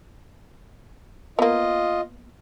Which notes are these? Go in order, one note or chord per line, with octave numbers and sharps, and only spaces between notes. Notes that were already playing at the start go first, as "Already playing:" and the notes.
A#3 B3 F4 D#5